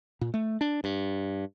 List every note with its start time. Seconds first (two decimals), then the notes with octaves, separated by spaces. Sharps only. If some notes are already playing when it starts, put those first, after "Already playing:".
0.21 A#2
0.34 A3
0.61 D4
0.84 G2